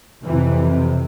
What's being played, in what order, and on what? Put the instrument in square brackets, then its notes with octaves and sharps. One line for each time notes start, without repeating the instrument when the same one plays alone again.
[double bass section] F2 C3 E3